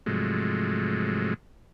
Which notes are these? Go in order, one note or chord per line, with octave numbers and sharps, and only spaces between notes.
G#2 C3 F3 F#3 G#3 A3